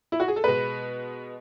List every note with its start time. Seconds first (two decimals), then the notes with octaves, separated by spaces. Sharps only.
0.12 E4
0.20 F#4
0.28 G#4
0.36 A4
0.44 B2 G#3 B3 B4